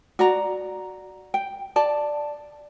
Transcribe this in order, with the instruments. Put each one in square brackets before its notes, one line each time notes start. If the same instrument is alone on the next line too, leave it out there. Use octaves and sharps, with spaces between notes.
[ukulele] F#4 D5 A#5
G5
D5 A5